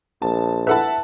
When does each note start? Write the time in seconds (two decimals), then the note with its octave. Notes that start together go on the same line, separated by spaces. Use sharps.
0.22 A#1 A5
0.67 E4 A4 B4 E5 F#5 A5